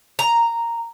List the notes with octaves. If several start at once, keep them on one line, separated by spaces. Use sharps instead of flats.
A#5